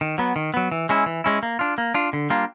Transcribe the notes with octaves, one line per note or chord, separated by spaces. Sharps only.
D#3
F#3 B3
D#3
F#3 B3
E3
G#3 C#4 E4
E3
G#3 C#4 E4
A#3
D4 F4
A#3
D4 F4
D3
G3 A#3 D4 F4